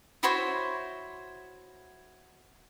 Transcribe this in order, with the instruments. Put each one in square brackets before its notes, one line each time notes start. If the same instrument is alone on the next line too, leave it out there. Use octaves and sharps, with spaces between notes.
[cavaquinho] E4 F#4 C5 C#5